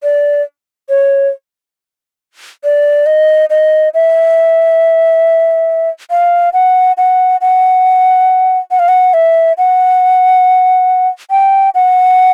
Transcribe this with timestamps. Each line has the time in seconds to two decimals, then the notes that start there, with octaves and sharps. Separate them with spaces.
0.03 D5
0.89 C#5
2.64 D5
3.06 D#5
3.50 D#5
3.94 E5
6.10 F5
6.53 F#5
6.97 F#5
7.41 F#5
8.71 F#5
8.79 F5
8.88 F#5
9.14 E5
9.58 F#5
11.31 G5
11.75 F#5